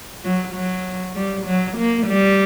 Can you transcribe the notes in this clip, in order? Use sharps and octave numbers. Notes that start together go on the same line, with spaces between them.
F#3
F#3
G3
F#3
A#3
G3